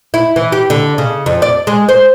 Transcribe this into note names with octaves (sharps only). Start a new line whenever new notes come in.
E4
E3
G4
D3
C#3
F2
D5
G#3
C5